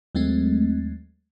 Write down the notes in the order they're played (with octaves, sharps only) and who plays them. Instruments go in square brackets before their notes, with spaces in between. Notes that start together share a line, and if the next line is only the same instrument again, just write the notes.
[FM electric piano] D#2 F#3 G#3 A3 C4